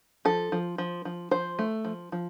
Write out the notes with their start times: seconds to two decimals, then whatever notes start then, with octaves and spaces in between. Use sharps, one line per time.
0.25 F3 A4
0.52 F3
0.78 F3
1.05 F3
1.31 F3 C5
1.59 A3
1.85 F3
2.12 F3